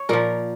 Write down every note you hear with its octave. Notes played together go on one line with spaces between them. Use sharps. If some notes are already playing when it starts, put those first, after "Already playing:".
Already playing: C#5
A#2 F3 A#4